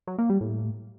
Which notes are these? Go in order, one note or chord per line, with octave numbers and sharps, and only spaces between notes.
F#3
A#3
G3
A2